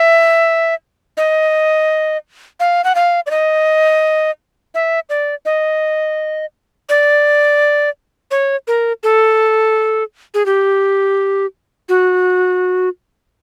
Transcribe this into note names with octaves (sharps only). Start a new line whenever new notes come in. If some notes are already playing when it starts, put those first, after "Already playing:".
Already playing: E5
D#5
F5
F#5
F5
D5
D#5
E5
D5
D#5
D5
C#5
A#4
A4
G#4
G4
F#4